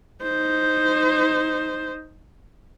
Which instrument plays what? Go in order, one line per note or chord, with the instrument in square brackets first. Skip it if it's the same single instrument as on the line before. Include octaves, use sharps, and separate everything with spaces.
[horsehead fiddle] D#4 C5